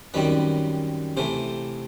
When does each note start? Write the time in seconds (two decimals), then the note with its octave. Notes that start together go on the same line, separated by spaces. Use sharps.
0.14 F#2 D#3 G3 C4 B4
1.17 C3 E3 A3 C5